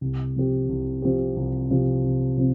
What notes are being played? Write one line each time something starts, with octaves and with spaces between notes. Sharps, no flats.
C2
C3 F3 C4 G4
C2
C3 F3 C4 G4
C2
C3 F3 C4 G4
C2
C3 F3 C4